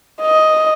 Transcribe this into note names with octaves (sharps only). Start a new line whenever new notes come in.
D#5